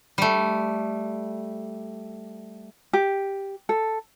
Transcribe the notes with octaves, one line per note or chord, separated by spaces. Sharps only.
G3 A3
G4
A4